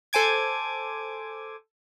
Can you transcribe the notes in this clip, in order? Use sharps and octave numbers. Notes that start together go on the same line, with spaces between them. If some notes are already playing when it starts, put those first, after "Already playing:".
A4 C5 G#5 D6 G#6